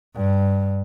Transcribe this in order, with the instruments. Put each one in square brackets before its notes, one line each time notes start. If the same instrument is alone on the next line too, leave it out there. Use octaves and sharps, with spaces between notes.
[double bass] G2